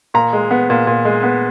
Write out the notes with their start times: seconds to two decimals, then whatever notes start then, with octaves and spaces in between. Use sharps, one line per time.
0.14 A#2 A#5
0.33 G#3
0.51 B3
0.70 A#2
0.87 A#2
1.05 G#3
1.23 B3